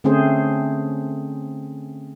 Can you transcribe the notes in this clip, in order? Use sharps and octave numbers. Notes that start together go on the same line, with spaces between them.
D3 A3 C4 C#4 G#4 C5